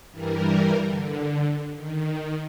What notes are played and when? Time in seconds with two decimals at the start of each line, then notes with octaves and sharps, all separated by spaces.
0.10 G2 E3 G3 A#4
0.80 D3
1.75 D#3